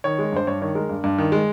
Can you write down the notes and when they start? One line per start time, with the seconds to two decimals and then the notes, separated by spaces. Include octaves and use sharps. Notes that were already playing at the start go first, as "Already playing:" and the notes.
0.04 D#3 C#5
0.19 G#3
0.32 G2 C5
0.47 G2 C#5
0.62 D#3 C#5
0.75 G#3 A#4
0.89 G2
1.04 G2
1.18 D#3
1.32 G#3